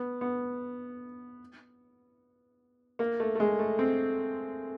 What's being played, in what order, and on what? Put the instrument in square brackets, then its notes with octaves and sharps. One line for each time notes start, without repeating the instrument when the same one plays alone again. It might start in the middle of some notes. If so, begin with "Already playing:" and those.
Already playing: [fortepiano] B3
B3
A#3
A3
A3
G#3
A3
C4